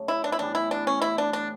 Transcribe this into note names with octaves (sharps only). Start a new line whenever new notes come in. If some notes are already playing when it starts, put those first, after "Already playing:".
Already playing: F#2 C#3 F#3 A3
E4
D4
E4
A2 E3 G3 B3 D4
E4
D4
C#4
E4
D4
D4